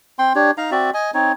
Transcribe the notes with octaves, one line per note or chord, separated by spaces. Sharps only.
C4 G5 C6
D4 G4 C#5
D#4 F5 A#5
C4 F#4 D5 E5
D#5 G#5
C4 D#4 C#5